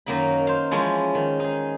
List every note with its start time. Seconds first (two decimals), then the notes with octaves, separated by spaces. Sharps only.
0.06 F#2 D#3 F#3 A#3 D#4 B5
0.47 C5 F5
0.71 E3 F3 G#3 C#4
1.15 D#3
1.40 D#4 G#4